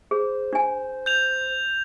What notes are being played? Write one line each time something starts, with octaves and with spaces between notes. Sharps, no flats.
G#4 C5
D4 G#5
G6 F7